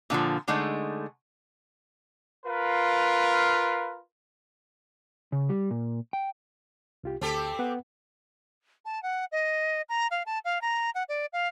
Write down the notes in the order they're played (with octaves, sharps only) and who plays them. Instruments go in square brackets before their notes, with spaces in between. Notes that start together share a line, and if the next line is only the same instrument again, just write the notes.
[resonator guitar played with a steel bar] A#2 D3 E3 F3
D3 G#3 A3 D#4
[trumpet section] F4 A#4 B4 F5
[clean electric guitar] C#3
G3
A#2
G5
[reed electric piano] C2 F4 G4
[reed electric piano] D2 A5 [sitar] C4 G4 A4
[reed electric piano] B3 B4 F#5
[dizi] A5
F#5
D#5
A#5
F5
A5
F5
A#5
F#5
D5
F5